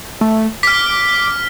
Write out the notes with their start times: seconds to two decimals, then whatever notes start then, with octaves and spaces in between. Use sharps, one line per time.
0.21 A3
0.63 D6 F6 B6